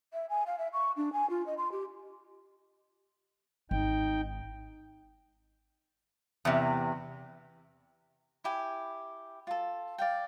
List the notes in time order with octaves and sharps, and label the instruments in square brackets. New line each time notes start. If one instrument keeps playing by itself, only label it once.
[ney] E5
G#5
F5
E5
C#6
D4
G#5
F4
D#5
C6
G4
[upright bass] G#1 [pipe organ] D#4 G5
[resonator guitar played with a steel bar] E2 C3
[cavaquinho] E4 G4 G#5
F4 A4
D5 F5 G5